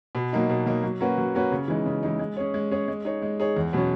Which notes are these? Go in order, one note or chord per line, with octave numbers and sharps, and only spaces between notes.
B2
F#3 A#3 D#4
B2
F#3 A#3 D#4
F#3
A#3 C#4 F#4 B4
F#3
A#3 C#4 F#4 B4
C#3
E3 G#3 D#4
C#3
E3 G#3 D#4
G#3
C#4 G#4 C#5
G#3
C#4 G#4 C#5
G#3
D#4 G#4 C#5
G#3
D#4 G#4 C#5
E2
B2 F#3 C#4